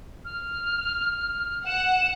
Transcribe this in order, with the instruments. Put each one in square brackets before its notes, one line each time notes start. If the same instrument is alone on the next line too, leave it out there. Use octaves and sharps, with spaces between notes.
[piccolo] F6
[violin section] F#5 [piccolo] E7